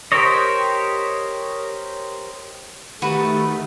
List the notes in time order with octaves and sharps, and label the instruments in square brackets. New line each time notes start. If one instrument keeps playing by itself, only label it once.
[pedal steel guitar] G4 A#4 C5 C#5 D#5
[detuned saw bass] D#3 [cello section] A3 [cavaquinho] F#4 B4 [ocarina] G4